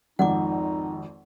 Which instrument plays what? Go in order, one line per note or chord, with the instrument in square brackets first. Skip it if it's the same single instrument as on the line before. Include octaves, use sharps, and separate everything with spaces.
[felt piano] G#1 F2 [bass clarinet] D#4 [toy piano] F#5 D6